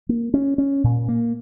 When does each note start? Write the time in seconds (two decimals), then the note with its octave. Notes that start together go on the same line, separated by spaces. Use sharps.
0.09 A#3
0.34 C#4
0.58 C#4
0.84 A#2
1.08 A#3